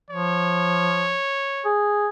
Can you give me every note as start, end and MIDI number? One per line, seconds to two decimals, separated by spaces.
0.10 1.17 53
0.10 1.71 73
1.65 2.09 68